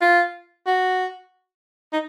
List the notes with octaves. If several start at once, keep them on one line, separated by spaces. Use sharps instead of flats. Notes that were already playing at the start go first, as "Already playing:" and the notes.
F4
F#4
D#4